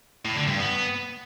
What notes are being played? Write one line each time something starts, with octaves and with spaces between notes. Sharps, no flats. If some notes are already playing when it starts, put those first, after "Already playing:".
A2
D3
G2
B3